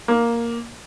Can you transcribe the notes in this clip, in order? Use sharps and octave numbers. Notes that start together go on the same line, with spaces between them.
A#3